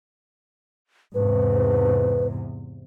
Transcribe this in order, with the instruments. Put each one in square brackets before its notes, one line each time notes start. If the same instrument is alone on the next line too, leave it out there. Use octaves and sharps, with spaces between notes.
[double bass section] E2 G#2 C3 [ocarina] B4